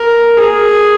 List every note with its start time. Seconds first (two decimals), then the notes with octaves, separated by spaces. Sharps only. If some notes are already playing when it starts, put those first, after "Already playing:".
Already playing: A#4
0.37 G#4